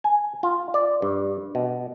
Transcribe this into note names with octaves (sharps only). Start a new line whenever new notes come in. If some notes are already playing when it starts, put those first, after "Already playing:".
G#5
F4
D5
G2
B2